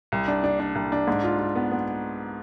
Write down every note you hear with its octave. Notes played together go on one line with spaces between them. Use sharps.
C2
D4
D4
D4
C2
D4
G#2
F4
F4
B3
B3